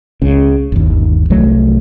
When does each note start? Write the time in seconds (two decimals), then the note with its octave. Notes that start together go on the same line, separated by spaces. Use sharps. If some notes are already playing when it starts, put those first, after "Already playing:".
0.22 C#2 C#3
0.72 G1 D#2
1.30 C2 F#3 A3